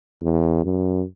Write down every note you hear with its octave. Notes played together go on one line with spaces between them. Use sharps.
E2
F#2